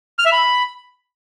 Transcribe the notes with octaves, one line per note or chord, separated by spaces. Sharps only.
F6
E5
B5